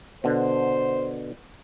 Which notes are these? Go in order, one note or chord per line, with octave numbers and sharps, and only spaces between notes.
B2 D3 C5